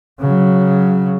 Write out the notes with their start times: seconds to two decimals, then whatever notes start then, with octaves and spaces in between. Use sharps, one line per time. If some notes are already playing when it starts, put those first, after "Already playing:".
0.20 C#3 F#3